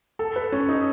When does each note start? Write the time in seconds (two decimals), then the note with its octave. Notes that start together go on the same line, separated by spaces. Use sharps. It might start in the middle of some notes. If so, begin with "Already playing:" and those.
0.19 A4
0.36 B4
0.52 C#4
0.69 D#4